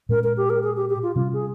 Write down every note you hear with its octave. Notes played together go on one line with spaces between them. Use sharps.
A#2 G#3 C#4 A#4
A#4
G4
A#4
G#4
G4
G4
F4
C3 G3 C#4 F4
G#4